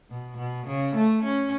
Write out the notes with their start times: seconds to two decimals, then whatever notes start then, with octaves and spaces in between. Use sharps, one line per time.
0.10 B2
0.37 B2
0.67 C#3
0.96 A3
1.23 C#4